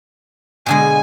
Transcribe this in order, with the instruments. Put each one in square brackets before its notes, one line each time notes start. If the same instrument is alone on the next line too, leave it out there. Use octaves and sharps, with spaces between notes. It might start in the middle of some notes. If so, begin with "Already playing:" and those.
[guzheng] B2 D3 G#3 [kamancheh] G#5